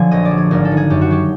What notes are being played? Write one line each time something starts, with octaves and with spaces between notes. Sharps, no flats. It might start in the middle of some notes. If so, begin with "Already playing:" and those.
Already playing: D3 F3 F#3 G#5
A#1 D#5
D5
F#3
G#4
G#1 A#4
A4
D#3
G#4
F#2 G4
F#4
F#3 G4